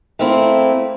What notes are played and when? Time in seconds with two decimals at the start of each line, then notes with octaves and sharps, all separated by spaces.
0.19 A3 A#3 C4 E4